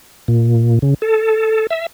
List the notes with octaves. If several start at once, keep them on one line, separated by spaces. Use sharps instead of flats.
A#2
C#3
A4
E5